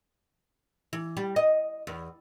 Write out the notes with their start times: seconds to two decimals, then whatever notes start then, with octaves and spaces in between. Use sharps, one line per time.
0.93 E3
1.17 G3
1.36 D#5
1.87 E2